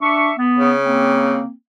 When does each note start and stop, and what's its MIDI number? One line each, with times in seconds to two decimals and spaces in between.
0.01 0.32 62
0.01 0.32 76
0.01 0.32 85
0.38 0.72 59
0.58 1.39 49
0.84 1.51 58
0.84 1.51 60